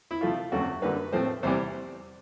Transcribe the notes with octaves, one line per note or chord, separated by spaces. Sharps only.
E4
C3 F3 A3 C4 F4
E2 C#3 F#3 A3 C4 F#4
F#2 D3 G3 A#3 B4
A2 F3 A3 C4 C5
E2 C3 E3 G3 C5